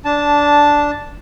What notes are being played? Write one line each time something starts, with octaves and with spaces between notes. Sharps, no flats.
D4 A5